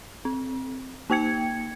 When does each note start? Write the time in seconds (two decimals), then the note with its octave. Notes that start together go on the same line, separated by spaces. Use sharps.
0.25 C4
1.10 A#3 D#4 G5 G#6 C#7